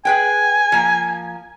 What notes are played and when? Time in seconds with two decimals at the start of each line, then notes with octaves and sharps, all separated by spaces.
0.05 G#4 B4 G5 G#5
0.72 F3 A#3